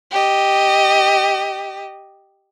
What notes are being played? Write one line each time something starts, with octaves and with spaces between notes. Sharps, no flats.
G4 D#5